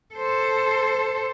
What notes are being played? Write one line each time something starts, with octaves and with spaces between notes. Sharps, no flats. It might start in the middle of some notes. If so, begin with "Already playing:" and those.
A4 C5